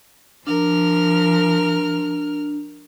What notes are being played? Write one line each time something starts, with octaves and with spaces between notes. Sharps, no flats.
F3 D4 A#4 F6